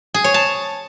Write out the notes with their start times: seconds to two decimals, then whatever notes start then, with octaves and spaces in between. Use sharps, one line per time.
0.14 G#4
0.24 C#5
0.34 A5